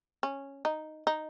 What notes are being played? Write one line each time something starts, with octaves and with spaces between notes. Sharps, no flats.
C#4
D#4
D#4